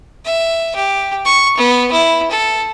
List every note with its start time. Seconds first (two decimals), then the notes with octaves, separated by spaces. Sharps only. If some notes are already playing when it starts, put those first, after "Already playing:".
0.25 E5
0.76 G4
1.25 C#6
1.57 B3
1.92 E4
2.31 A4